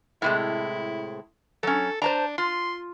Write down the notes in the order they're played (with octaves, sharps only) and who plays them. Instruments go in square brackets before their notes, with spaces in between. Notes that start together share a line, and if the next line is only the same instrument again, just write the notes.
[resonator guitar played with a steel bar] A2 C3 G#3 [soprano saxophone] E4
[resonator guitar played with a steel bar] F#3 C#4 [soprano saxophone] A4
[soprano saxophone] D4 [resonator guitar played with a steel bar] C5 A5 A#5
[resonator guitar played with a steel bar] F4 [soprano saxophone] C6